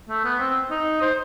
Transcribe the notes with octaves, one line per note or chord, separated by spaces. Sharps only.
A3
B3
C4
D#4
C5